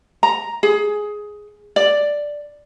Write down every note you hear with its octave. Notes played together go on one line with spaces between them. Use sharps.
A#5
G#4
D5